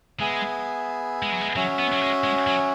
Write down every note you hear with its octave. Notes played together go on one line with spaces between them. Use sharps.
G#3 B3 G#4 E5 G#5
G#3
F#3
G#3
F#3 C#4 F#4 E5 G#5
B3
F#3
G#3
G#3
F#3